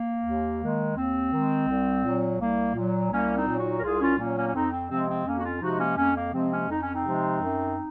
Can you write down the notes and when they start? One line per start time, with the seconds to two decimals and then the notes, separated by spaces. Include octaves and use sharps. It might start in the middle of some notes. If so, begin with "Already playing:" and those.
Already playing: A#3
0.24 D#2
0.61 D#3 G#3
0.96 D#2 C4
1.32 D#3 G#3
1.68 C2
2.04 A#2 F#3
2.39 C2 A#3
2.75 A#2 F#3
3.11 C2 A#3 C#4
3.36 C4 D#4
3.47 A#2 F#3
3.59 D#4 F#4
3.79 A#4
3.83 C2 F4 G#4
4.01 C#4 F4
4.18 A#2 F#3 A#3 C#4
4.36 A#3 C#4
4.47 C#4
4.54 F2 C4 D#4
4.72 C4
4.90 C3 F3 G#3 C4
5.09 C4
5.26 F2 A#3 C#4
5.37 F#4
5.43 C#4 F4
5.61 C3 F3 G#3 D#4 F#4
5.79 A#3 C#4
5.97 F2 A#3 C#4
6.15 A#3
6.33 C3 F3 G#3 C4
6.51 A#3 C#4
6.69 F2 D#4
6.82 C#4
6.93 C4 D#4
7.04 C3 F3 G#3
7.40 F#2